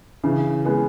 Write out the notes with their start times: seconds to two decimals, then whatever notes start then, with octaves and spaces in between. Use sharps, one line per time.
0.23 C#3 E3
0.65 G#3 B3